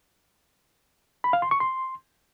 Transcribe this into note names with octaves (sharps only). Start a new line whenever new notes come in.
B5
F5
C6
C#6
C6